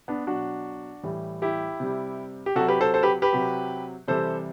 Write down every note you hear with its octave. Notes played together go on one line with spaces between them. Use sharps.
B3 D4
B2 F#3 D4 F#4
A2 E3 G3
E4 G4
C3 G3
G4
C3 F#3 F#4 A4
G4 B4
A4 C5
A4 C5
G4 B4
G4 B4
C3 F#3
C3 E3 G3 A4 C5